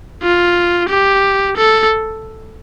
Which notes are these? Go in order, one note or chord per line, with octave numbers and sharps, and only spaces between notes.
F4
G4
A4